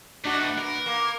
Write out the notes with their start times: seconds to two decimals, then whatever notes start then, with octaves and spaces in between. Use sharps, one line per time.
0.24 A3 D4 D#4 F#4
0.41 B3
0.58 A#4
0.86 A#3